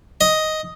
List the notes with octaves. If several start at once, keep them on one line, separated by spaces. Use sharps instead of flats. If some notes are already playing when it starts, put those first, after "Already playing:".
D#5